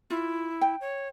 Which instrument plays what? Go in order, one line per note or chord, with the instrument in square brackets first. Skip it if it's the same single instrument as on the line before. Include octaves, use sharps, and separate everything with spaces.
[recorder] E4 [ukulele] F4
[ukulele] G5
[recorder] C#5